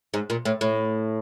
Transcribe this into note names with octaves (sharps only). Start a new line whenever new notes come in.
G#2
A#2
A2
A2